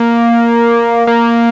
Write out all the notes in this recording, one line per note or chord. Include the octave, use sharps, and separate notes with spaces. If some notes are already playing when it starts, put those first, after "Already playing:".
Already playing: A#3
A#3